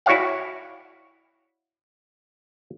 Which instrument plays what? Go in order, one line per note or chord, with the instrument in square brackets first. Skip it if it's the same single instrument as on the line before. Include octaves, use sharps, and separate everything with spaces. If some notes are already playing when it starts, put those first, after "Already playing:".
[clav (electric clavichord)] E4 F#4 C#5 D5 F5 F#5